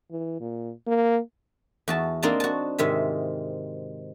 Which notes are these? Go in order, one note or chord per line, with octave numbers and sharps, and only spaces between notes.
E3
A#2
A#3
E2 F#4 A5
A#3 C4 D4 D#4 F5 A5
F#4 A5
G#2 C3 D#3 E5